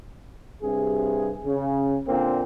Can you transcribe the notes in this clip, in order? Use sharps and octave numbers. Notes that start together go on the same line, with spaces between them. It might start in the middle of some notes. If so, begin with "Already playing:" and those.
G2 C3 G#4
C#3
A#2 D3 A#3 C4